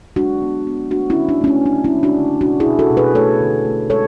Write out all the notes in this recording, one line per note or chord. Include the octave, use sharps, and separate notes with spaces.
G#3 D4 F#4
B3
B3
A3 D4 F#4
C#4 E4
D3
D4
A3 C#4
D4
C#3 D4
C#4 E4
G#3
D4 F#4
C#3
B2 D4 F#4
E4 G#4
B2
F#4 A4
B2
G#4 B4
A3 A4 C#5
D3
A3
G#3 A4 C#5